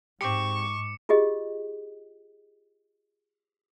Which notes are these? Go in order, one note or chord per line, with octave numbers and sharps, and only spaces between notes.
G#2 C4 G4 C#6 D6 C#7
F4 G4 G#4 D#5